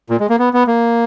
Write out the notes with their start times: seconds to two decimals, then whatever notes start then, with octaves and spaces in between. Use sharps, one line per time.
0.10 A#2
0.20 G#3
0.29 A#3
0.39 B3
0.53 B3
0.67 A#3